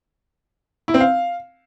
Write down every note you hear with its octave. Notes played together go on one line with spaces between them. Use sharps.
E4
C4
F5